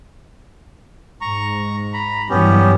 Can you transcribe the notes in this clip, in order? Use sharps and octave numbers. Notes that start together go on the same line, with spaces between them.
G#2 A#5 C#6
A#5 B5
G2 E3 F#3 B3 C#4 G4